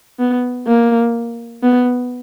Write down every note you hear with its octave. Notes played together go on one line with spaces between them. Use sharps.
B3
A#3
B3